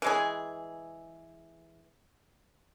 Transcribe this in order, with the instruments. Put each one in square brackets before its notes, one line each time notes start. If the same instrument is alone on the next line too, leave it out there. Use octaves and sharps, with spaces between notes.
[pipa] E3 G#3 G#4